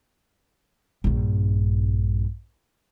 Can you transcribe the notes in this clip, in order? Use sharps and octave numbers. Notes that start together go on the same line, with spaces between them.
A#1 G2